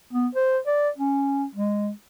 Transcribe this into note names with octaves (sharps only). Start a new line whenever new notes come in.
B3
C5
D5
C#4
G#3